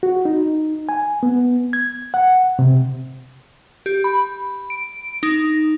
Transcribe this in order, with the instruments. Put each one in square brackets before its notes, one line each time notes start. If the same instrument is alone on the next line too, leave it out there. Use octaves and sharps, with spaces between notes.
[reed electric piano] F#4
D#4
G#5
B3
G#6
F#5
C3
[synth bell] G4
B5
D7
D#4